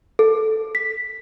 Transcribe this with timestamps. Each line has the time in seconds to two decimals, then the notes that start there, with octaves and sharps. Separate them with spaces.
0.19 A4
0.75 B6